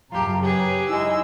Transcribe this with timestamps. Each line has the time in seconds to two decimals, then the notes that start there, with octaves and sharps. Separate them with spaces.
0.12 F#2 C#3 F4 G4 A5 A#5
0.43 G4 G#4 B4 C#5
0.88 G#3 D#4 E4 G#5 E6